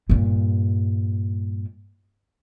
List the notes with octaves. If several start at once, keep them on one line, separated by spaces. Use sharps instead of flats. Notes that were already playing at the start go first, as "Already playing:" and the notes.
G2 A#2